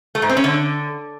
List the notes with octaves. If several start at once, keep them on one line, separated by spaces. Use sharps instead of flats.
A3
G#2
C4
C#4
D3